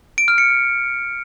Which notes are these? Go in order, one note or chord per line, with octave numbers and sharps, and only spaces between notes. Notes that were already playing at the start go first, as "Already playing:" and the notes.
D7
F6
C#7